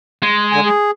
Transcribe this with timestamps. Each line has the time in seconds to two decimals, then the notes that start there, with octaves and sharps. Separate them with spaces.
0.23 G#3
0.52 D3 G#5
0.65 G#4